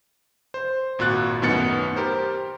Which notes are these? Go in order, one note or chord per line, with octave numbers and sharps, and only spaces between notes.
C5
G#1 A#2 F#4 F#6 A6
F#2 A2 D#3 B3 A6 C#7
G4 A#4 C5